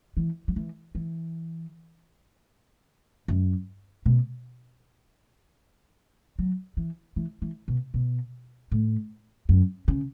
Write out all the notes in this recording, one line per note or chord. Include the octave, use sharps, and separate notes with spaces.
E3
F#3
E3
E3
F#2
B2
F#3
E3
E3
E3
B2
B2
A2
F#2
C#3